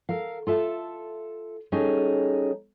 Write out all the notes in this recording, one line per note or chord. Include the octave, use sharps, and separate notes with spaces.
A4 A#4 F5
F4 A4 E5 A5
G3 C#4 D#4 G#4 A4